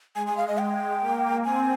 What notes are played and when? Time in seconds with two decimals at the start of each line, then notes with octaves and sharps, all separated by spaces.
0.15 G#3 G#5
0.27 G#5
0.37 F5
0.48 D#5
0.59 G5
1.01 A#3
1.45 C4 G#5